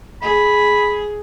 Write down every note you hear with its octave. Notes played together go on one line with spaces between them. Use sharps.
G#4 B5